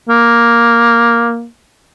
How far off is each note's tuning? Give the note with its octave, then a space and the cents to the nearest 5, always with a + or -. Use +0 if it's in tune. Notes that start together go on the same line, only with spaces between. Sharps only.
A#3 +5